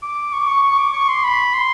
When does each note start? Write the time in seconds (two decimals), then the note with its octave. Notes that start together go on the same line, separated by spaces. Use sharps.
0.02 D6
0.33 C#6
0.40 D6
0.47 C#6
0.63 C#6
0.78 D6
0.93 C#6
1.08 C6
1.24 B5
1.54 C6